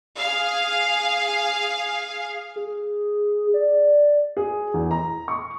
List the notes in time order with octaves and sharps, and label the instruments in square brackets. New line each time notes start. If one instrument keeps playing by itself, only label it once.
[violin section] G#4 F5
[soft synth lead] G#4
D5
[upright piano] G#4
E2
A#5
C#6